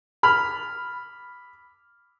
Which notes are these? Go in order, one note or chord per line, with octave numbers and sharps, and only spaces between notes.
B5 F6